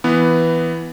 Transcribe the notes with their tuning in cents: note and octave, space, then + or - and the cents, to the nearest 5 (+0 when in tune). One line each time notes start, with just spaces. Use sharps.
E3 +0 B3 +0